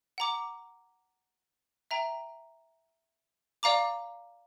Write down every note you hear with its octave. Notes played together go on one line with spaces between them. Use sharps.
F#5 A#5 D6
E5 G5 A#5
D5 F5 A#5 D6